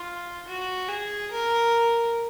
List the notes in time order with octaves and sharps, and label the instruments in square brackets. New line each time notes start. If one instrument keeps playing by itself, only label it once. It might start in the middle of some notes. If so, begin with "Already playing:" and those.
Already playing: [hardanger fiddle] F4
F#4
G#4
A#4